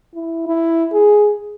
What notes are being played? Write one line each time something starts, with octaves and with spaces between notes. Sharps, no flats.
E4
E4
G#4